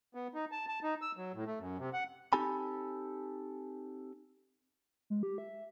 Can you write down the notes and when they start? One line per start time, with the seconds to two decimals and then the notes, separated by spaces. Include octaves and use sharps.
0.15 B3
0.34 D#4
0.52 A5
0.68 A5
0.83 D#4
1.02 E6
1.17 F#3
1.34 A2
1.47 A3
1.60 F#2
1.79 C3
1.93 F#5
2.33 C4 D#4 G4 A4 G#5 B5
5.10 G#3
5.23 G4
5.38 E5